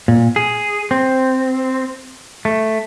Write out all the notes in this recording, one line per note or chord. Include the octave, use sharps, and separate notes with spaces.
A#2
G#4
C4
A3